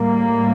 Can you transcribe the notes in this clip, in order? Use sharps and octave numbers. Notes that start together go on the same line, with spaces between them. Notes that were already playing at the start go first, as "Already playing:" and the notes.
Already playing: A2 G3 A#3